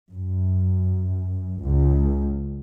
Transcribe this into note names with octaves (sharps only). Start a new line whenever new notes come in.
F#2
C#2